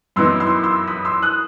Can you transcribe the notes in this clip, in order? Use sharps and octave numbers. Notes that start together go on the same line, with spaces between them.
F#2 E3 B3 D#4 C6 E6
C6 E6
C6 E6
B5 D#6
C6 E6
D#6 F#6